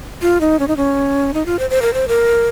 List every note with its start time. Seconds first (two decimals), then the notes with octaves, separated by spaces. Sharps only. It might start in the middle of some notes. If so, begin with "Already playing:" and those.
0.22 F4
0.41 D#4
0.59 C#4
0.68 D#4
0.77 C#4
1.34 D#4
1.46 F4
1.59 C5
1.70 C5
1.82 A#4
1.94 C5
2.08 A#4